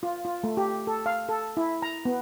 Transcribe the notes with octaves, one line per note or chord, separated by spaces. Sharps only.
F4
F4
A3
G4
A4
F5
A4
E4
A#5
B3